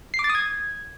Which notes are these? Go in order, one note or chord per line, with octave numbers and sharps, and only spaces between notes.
C7
D6
A6
D#6
G#6